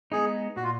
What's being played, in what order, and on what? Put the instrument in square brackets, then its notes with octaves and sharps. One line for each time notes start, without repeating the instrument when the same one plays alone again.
[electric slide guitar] G#3 B3 D#4 [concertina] G#4
[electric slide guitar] A#2 [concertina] F#4
[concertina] F4